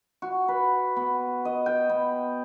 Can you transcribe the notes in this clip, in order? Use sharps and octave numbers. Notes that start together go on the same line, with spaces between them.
F#4
B4
B3
D#5
G5
B3